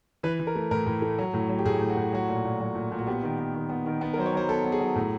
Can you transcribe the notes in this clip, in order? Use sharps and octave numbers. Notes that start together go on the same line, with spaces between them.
E3 B4
E3
A#4
A3
A2 A#4
A2
A3
F#3
A2
F#3
G4
A2 G#4
A2
F#4
A2
F#3 F#4
A#2
A#2
F#3
A#2
A#2
F#4
B3 G4
D#3
B3
D#3
B3
D#3
B3
A#4
F#3 C5
C#5
F#3 C5
B3 A4
B3
G#4
F#3
A2